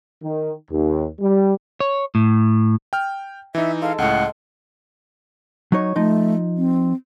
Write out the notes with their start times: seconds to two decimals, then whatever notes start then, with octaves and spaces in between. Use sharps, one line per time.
0.23 D#3
0.71 D#2
1.21 G3
1.80 C#5
2.15 A2
2.93 G5 F6
3.55 E3 D#4 E5
3.81 G#3 A4 F5
3.98 C#2 A2 F#5
5.72 F#3 D#4 C#5
5.96 F3 A3 D#4
6.57 C4